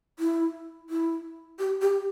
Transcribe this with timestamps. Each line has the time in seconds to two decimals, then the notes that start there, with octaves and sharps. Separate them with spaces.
0.19 E4
0.90 E4
1.59 G4
1.82 G4